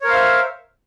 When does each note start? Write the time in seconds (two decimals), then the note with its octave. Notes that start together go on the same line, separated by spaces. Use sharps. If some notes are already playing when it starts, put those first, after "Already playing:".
0.01 C#5
0.04 A#4
0.07 C5
0.10 F5
0.14 E5